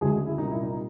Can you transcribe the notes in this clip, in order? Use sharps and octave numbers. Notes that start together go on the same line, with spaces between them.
D2 C#3 F#3 G#3 G#4
E4
C2 A#2 G3 D#4
E4
D#4